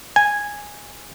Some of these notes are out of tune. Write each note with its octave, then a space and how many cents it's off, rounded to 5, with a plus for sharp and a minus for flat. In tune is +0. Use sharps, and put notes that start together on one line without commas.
G#5 -10